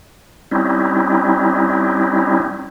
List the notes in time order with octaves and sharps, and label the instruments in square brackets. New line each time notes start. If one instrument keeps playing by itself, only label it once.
[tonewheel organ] G3 C4 C#4 D#4 E4